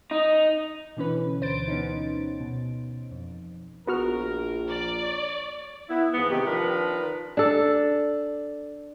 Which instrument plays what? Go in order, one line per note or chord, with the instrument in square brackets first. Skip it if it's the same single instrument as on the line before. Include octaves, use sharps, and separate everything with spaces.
[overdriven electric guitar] D#4
[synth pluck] B2 D3 E3 C#4 B4
D2 C5 A6 D7
B3 C#4 D#4
B2
F2
[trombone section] A#1 [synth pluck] B3 F#4 F6 [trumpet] A#4
[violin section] D5
[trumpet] C#5
[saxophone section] B3 E4
G#2 E3 F3 B3
C3 D#3 G#3 G4
D#3 F3 D4 A#4 B4
[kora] D4 A4